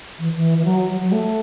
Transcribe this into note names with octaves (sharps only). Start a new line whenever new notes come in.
E3
E3
E3
F#3
F#3
F#3
A3